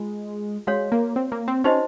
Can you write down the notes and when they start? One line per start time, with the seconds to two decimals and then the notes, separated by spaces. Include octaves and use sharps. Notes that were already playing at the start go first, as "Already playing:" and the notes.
Already playing: G#3 F4
0.67 G#3 F#4 C#5 F5
0.92 A#3
1.16 C4
1.32 A#3
1.48 C4
1.64 C#4 D#4 F#4 C5 D#5